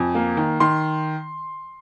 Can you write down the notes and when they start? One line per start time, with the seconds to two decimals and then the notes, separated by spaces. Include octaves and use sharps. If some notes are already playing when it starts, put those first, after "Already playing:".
Already playing: F2 G#5
0.15 A#3
0.37 D#3
0.60 D#3 C6